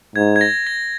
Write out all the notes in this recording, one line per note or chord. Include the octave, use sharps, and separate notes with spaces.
G#2 G#6
G#6
A#6
A#6